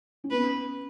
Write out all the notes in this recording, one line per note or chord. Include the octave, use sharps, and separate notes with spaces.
C#4
B3 B4